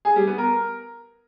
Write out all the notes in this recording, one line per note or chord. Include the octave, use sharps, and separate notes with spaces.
G#4
G3
B3
A#4